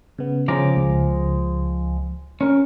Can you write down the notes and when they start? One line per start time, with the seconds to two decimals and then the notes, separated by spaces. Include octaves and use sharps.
0.18 C#3 B3
0.48 C#3 F3 G#3 C#4 A#5 D6
0.77 C#2
2.41 C#4 A#4